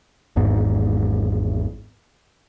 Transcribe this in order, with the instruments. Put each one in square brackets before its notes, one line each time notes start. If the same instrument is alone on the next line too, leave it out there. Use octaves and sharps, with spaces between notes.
[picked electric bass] G#1 E2 G#2